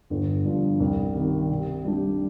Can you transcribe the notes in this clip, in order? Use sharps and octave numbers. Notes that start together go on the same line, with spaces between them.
G1
G2 F3
C2
C3 D#3
C3
G3 D4 G4